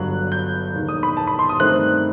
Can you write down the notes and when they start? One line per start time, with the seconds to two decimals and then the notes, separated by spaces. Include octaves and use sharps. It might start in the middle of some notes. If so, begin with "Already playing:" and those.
Already playing: G1 G2 F#3 F#6
0.32 G6
0.75 E1 D#2 D#3
0.88 D#6
1.03 B5
1.17 A5
1.27 B5
1.39 C6
1.49 D#6
1.60 G2 D#3 A3 C4 F#6